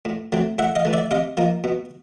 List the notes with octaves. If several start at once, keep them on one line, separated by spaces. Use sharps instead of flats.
A2
F#3 A3 C4
A2 E5 F#5
D#5 F5
E3 A3
D5 E5
C3 D#5 F5
F3 A#3 D#4
B2